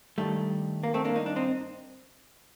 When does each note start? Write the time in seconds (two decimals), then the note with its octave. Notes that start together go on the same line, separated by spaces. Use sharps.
0.18 G2 D#3 G3 A3
0.84 A#3
0.94 A3 C4
1.05 A#3 D4
1.16 D#4
1.26 D4
1.36 C4 D#4